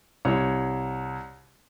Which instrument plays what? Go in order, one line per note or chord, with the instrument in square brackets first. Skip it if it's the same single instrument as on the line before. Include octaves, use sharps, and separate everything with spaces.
[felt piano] C2 C#5